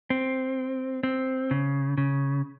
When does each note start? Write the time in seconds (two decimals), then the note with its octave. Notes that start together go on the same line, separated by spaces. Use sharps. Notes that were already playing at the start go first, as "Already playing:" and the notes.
0.10 C4
1.03 C4
1.51 C#3
1.98 C#3